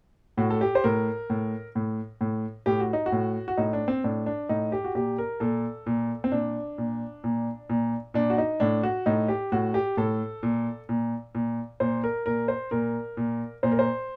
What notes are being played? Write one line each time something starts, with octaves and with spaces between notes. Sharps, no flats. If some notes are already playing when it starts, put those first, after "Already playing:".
A2 F#4
A4
G4
C5
A2 A#4
A2
A2
A2
A2 G4
F#4
D#4
F#4
A2
F#4
A2 D#4
D4
C4
A2 D4
D4
A2 D#4
G4
F#4
A#2 G4
A#4
A#2 A4
A#2
C4
A#2 D4
A#2
A#2
A#2
A#2 D4
F#4
D#4
A2 D4
F#4
A2 D#4
G4
A2 F#4
G4
A2 A4
A#2
A#2
A#2
A#2 C5
A#4
A#2 A#4
C5
A#2 A#4
A#2
A#2 C5
A#4
C5